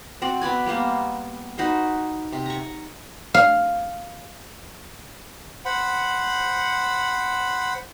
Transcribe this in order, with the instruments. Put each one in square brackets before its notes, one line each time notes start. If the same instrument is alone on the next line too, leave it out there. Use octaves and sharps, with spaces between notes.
[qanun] C4 F#4 D5
B3 B4 D5 G#5
G3 A#3 B3 C5
D#4 F#4 B4 C5
C3
A#5 C#6
[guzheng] F5
[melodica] C5 F#5 B5